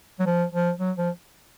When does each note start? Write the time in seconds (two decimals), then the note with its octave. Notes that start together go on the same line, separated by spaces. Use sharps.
0.19 F#3
0.26 F3
0.53 F3
0.79 F#3
0.97 F3